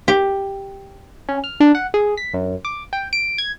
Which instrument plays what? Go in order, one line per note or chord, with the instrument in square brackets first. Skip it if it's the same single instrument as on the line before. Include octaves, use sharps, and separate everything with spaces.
[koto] G4
[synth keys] C#4
F6
D4
F#5
G#4
B6
F#2
D6
G5
D7
G#6